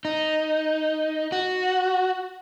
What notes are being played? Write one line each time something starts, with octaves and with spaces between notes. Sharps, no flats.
D#4
F#4